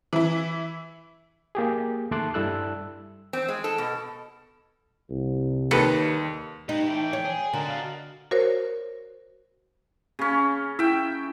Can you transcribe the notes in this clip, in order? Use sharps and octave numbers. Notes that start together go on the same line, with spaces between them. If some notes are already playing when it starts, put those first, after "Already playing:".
E3 E4
A#3 G4 G#4
D#2 A3 A5 C6 D6 F#6
G2 G3 E4 A4 E6 F#6
C4
G#3
A4
B2
C2
D#2 D#3 G3 A4 B4 C#7
D#4 G4 B4
E3 A3 G5
C#5
G#4
D3 F#4 A#4 D#5
F5
F#4 A#4 C5 C#5
C#3 C#4
E4 E5 G5